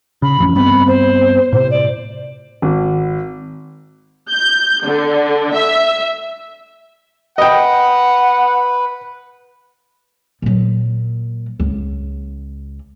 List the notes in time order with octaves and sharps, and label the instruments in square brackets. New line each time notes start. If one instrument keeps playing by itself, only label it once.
[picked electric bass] C#3 [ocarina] B5
[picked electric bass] A1 F2 C#4
[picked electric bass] G2 B3 C4 [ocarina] B5
[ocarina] C5
[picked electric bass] A2 C3 [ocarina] C5
[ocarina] D5
[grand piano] G#1
[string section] G6
D3
E5
[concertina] B4 [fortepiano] D#5 G5 [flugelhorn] F#5
[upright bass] A#2 F#3
C#2